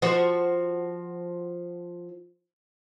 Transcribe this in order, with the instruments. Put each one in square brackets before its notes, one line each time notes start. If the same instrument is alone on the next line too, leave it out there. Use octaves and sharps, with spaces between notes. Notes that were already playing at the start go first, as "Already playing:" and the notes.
[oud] F3 F#4 C5